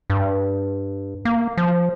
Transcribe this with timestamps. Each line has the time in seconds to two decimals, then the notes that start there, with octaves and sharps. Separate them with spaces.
0.10 G2
1.25 A#3
1.57 F3